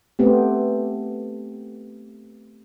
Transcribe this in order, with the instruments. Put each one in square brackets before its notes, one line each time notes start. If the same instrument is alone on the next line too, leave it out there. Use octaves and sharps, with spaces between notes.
[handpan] A3 B3 C4 G4